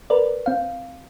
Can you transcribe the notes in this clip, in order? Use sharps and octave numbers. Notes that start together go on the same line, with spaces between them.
A#4 B4 D5
C4 F5